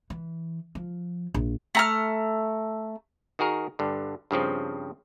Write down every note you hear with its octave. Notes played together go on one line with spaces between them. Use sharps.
E3
F3
A#1
A3 A#5 F6
D#3 F#4 G#4 A#4
G2 D3
G2 C#3 F3 C4